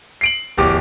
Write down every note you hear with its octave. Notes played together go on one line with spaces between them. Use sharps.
C7 D7 F#7
D1 E2 G4 D6